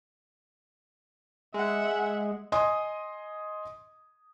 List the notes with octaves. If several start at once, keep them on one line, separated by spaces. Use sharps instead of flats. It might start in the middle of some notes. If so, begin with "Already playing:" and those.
G#3 E5 F#5
D#5 G#5 C6 D#6